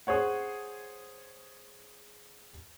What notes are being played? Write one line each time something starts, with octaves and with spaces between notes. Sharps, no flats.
G#4 C5 C#5 F#5